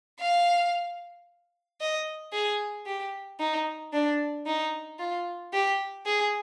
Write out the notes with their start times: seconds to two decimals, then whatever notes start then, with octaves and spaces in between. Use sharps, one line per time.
0.20 F5
1.81 D#5
2.33 G#4
2.86 G4
3.40 D#4
3.93 D4
4.46 D#4
5.00 F4
5.53 G4
6.06 G#4